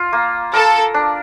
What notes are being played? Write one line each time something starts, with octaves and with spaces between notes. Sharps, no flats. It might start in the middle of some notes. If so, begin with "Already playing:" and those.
Already playing: F4
A#3
A4 A#4
D4